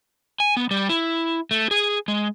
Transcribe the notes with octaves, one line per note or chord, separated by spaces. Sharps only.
G#5
B3
G3
E4
A3
G#4
G#3